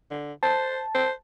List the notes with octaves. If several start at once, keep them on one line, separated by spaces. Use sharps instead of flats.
D3
C5 A5
C5